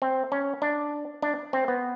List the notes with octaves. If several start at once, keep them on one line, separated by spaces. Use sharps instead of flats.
C4
C#4
D4
D4
C4
B3